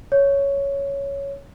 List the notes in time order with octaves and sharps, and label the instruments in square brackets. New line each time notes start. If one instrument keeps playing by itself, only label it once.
[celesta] C#5